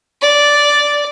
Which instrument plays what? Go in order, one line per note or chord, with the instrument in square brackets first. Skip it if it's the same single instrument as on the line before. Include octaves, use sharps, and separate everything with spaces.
[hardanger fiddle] D5